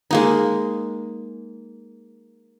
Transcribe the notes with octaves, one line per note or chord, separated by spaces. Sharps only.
G#3 A#3 D#4